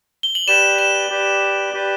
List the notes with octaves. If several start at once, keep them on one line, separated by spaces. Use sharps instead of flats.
G7
F#7
G4 B4 D5 E7
E7
G4 B4 D5
G4 B4 D5